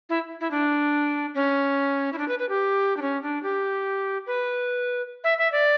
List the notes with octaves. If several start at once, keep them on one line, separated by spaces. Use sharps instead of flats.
E4
E4
D4
C#4
E4
D4
B4
B4
G4
D4
C#4
D4
G4
B4
E5
E5
D5